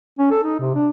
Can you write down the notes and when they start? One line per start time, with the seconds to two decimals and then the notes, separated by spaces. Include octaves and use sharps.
0.18 C#4
0.31 A4
0.43 D#4
0.60 C3
0.75 D4